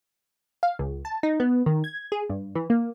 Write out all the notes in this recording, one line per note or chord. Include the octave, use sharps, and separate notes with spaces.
F5
C#2
A5
D#4
B3
D#3
G#6
G#4
G2
E3
A#3